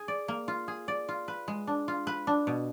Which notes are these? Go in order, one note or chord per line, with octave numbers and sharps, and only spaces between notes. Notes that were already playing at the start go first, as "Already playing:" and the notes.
Already playing: G#4
D5
A#3
F4
G#4
D5
F4
B4
G#3
D4
F4
B4
D4
B2